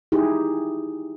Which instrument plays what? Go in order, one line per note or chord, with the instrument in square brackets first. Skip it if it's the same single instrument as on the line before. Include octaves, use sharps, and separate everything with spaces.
[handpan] D#4 E4 G4 G#4